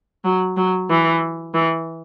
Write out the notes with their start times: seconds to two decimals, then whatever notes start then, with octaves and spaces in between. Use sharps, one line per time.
0.25 F#3
0.57 F#3
0.90 E3
1.54 E3